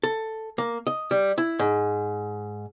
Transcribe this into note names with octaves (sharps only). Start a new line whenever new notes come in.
A4
A#3
D#5
G3
E4
G#2